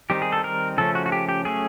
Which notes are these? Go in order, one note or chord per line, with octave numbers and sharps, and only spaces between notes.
D#3 G3 C4 D#4 G4
G#4
A4
A#4
C#3 F3 A3 C#4 A4
F#4
F#4
G4
G4
F#3 A3 C#4 G#4